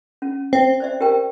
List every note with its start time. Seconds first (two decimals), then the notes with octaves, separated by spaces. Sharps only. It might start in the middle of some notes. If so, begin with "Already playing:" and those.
0.22 C#4
0.53 C4
0.80 C5 D5 E5
1.01 G4 A#4 G5